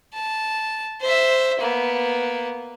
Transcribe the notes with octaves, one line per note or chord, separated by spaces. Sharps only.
A5
C5 E5
A#3 B3